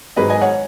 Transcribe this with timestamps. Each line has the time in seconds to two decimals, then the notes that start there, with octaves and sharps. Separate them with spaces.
0.16 G#1 G#2 F#3 B4 D#5
0.30 D#5 G#5
0.41 C#5 F#5